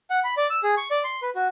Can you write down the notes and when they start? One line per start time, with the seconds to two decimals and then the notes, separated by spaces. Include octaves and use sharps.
0.10 F#5
0.24 B5
0.37 D5
0.50 E6
0.63 G#4
0.77 C#6
0.91 D5
1.04 C6
1.22 B4
1.35 F#4